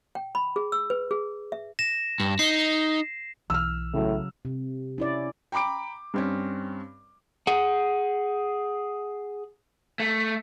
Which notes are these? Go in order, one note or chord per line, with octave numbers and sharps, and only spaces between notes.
G5
B5
G#4
E6
B4
G#4
E5
A#6 E7
G2
D#4 C7
B1 E3 E6 F6
A2 C#3 F#3
C3
C#4 E4 D5
G5 A#5 B5 D6 D7
G2 C4 C#4
G#4 F#5
A3